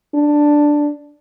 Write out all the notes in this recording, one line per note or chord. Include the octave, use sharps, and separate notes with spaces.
D4